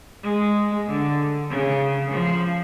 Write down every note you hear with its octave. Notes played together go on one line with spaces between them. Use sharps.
G#3
D3
C#3
F3